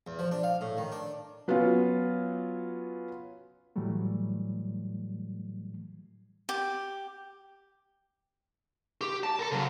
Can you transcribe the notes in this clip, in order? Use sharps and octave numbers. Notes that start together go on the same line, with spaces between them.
E2
F3
D4
F5
A2
D#3
D4
F#3 B3 C#4 F4
A2 E3 F#3 G3 A3
G4
G4
A5
A4 A#4
C#3 F#3